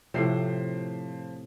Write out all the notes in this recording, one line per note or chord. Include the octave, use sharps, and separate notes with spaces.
A2 C3 F3 C5 C7